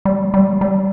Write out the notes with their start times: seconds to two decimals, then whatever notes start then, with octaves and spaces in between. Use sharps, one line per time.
0.05 G3
0.34 G3
0.61 G3